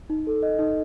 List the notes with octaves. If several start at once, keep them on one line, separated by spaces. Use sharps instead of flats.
D#4
A4
D#5
D#4